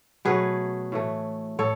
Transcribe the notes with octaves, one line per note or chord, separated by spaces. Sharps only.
B2 F#3 A3 G#4 B4
A2 E3 A3
A2 A4 C#5